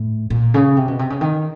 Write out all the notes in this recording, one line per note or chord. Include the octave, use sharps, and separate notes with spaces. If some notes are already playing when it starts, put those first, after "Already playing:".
Already playing: A2
A#2
C#3
C3
B2
C3
C#3
D#3